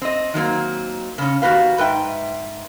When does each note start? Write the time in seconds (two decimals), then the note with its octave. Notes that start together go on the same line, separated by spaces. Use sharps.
0.02 C4 D#5
0.34 D#3 F#3 A#3 C4
1.18 C#3 C#4
1.42 D#3 B3 F#4 G4 B4 F5
1.78 G#2 B4 E5 G5